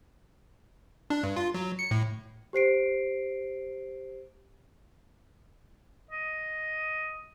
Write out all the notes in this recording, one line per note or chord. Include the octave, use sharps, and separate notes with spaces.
D4
G2
F4
F#3
C#7
A2
G4 C5 C7 D7
D#5